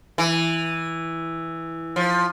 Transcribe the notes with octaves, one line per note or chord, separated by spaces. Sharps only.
E3
F3